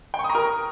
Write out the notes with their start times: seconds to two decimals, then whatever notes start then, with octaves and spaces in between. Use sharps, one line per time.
0.14 G5
0.19 C#6
0.24 D#6
0.30 A#5
0.35 A#4